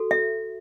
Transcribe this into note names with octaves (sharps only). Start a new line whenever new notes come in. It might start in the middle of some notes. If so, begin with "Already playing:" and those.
Already playing: F#4 A4
E5